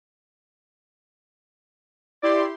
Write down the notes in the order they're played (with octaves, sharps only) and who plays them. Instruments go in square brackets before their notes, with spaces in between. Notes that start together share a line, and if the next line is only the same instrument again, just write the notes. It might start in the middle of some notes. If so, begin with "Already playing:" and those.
[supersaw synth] E4 G4 C6 [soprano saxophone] D5